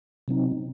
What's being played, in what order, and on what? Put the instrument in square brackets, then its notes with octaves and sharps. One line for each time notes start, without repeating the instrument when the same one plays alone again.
[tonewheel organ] C3 F#3 C4 D#4